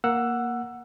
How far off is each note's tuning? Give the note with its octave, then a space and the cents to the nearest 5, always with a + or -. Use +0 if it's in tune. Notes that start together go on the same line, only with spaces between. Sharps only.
A#3 +5 F#5 -5 E6 +15